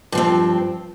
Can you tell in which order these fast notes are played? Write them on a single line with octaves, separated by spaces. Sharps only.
G2 F3 C4